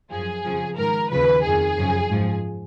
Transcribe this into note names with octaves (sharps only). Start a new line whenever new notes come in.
F#2 F3 G#4
F2 C#3 F3
G#2 D#3 A#4
D#2 C#3 F3 B4
F2 D#3 G#4
F#2 C#3 F3
G#2 F3